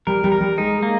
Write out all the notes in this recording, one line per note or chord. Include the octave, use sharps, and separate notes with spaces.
G3 A#4
G3
A#4
G3
G#3 D#4
A#3